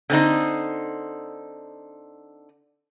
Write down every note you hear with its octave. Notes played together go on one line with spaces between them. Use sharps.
D3 C4 D#4